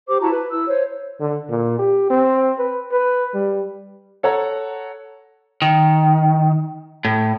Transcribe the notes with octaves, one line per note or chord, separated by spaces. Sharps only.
G4 C5 D6
E4 F#4 A5 A#5
B4
E4 E6
C5 C#5
D3
A#2
G4
C4
B4
B4
G3
A4 C#5 F#5 A#5
D#3
A2